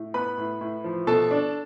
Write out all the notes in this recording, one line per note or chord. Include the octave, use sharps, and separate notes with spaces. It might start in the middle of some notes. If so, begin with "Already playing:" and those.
Already playing: A2
B3 B4 B5
A2
A2
F3
B2 A4 A5
D4